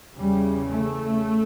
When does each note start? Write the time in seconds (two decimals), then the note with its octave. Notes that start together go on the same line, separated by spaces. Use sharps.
0.16 E2 C#3 G3
0.68 A3